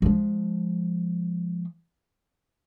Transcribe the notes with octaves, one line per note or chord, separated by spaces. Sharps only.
F3 G#3